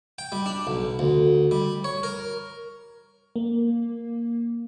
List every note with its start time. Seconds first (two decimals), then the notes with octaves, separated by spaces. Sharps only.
0.18 G5
0.32 G3
0.46 D4
0.67 B1
0.99 D2
1.51 G3
1.84 C#5
2.03 A#4
3.36 A#3